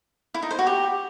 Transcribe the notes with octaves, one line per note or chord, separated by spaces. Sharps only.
E4
D#4
C5
F#4
G4